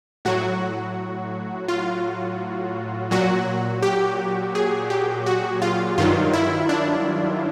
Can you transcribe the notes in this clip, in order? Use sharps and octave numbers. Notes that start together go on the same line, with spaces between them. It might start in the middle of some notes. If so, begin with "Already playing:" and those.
A2 F#3 F#4
F4
A#2 F#3 F#4
G4
G#4
G4
F#4
F4
G2 D#3 F#3 F4
E4
D4